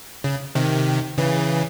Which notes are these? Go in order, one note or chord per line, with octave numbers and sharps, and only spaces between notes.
C#3
C3 D#3
C#3 E3